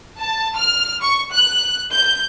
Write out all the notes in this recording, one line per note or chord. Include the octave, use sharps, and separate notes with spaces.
A5
F6
C#6
F#6
G6